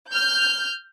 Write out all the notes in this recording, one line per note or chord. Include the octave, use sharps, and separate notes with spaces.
F6 G6